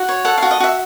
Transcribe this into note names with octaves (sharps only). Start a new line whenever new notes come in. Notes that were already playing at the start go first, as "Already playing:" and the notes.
Already playing: F#4
C#5
A4 F#5
F#4 F5
D#5
F#4 E5